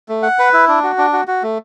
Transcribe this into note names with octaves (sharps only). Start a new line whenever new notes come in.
A3
F#5
B4
E4
D4
F#4
D4
F#4
F#4
A3